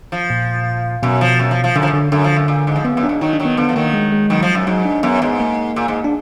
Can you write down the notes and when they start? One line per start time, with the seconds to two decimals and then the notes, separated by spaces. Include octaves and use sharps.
0.12 F3
0.30 A#2
1.03 F#2 B2
1.21 F3
1.39 F#2
1.51 F3
1.64 F3
1.75 F#2 D3
1.83 F3
1.88 F#2
1.93 D3
2.12 F#2 D3
2.24 F3
2.36 F#2
2.48 A#2
2.67 G#2
2.76 F3
2.84 F#2 B3
2.95 F#2 B3
3.03 D4
3.09 G#2
3.21 D#3 F#3 D#4
3.33 D4
3.40 D#3 F#3
3.45 B3
3.57 D3 F3 B3
3.69 F3
3.76 D#3 F#3 A#3
3.94 G#3
4.12 G#3
4.30 B2 D#3 F#3
4.42 F3
4.55 F#2
4.67 G#2 F#3
4.85 D4
5.03 F#2 B3
5.22 G#2
5.40 A#3
5.76 A#2
5.88 G#2
6.04 D4